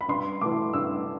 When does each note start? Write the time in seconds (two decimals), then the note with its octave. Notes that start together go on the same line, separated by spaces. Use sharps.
0.01 B5
0.08 G2 C6
0.41 E3 A3 D6
0.73 G2 E6